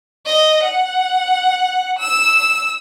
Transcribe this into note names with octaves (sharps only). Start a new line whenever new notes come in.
D#5
F#5
E6